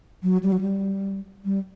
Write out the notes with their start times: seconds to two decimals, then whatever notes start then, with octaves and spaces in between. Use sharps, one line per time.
0.23 F#3
0.43 G3
0.52 F#3
0.61 G3
1.45 G3